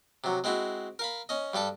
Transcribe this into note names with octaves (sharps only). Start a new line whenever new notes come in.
C3 F#3
G#3 C4 E4 F#4
A#4 F5 B5
C#4 D#5
G2 G3 A4 A5